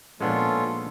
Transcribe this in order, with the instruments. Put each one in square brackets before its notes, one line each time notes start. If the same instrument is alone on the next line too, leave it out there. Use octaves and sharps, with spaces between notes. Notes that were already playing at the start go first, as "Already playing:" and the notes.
[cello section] A#2 [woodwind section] F3 [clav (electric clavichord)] G#3 B3 D4 [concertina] C#4 F4 A4